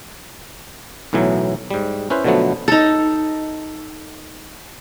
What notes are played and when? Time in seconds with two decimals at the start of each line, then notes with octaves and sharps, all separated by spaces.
1.13 B1 A2 E3 F#3
1.71 G#2 G3
2.10 C#4 E4 B4 C5
2.24 B2 D3 F3 F#3 A3 B3
2.68 D#4 A4